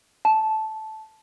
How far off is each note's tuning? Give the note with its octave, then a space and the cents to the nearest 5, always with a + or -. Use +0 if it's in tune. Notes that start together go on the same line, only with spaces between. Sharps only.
A5 -10